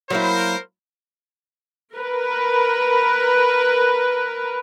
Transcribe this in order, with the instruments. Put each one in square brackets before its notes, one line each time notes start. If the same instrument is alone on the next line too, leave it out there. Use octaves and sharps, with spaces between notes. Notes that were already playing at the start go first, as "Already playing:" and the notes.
[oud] F#3 A#3 E4 [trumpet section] A#4 C5
[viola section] A#4 B4